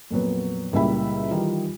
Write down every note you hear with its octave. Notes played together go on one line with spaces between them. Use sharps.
F2 A#2 F#3 B3
C#2 A#2 G3 E4 E5 B5
D#3 E3 G3 D#4 F4